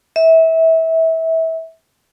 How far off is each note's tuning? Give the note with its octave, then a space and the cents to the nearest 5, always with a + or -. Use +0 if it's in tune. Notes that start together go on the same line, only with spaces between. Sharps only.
E5 -25